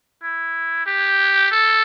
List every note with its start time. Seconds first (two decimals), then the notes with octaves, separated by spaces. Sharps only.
0.23 E4
0.86 G4
1.51 A4